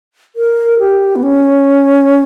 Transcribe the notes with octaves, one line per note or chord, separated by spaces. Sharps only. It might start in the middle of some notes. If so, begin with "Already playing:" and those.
A#4
G4
B3
C#4